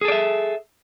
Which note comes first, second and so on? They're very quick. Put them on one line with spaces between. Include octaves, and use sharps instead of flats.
G#4 A4 D5 E5